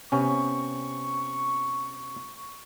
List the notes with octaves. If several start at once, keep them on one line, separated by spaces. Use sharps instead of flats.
C3 B3 C#4 C#6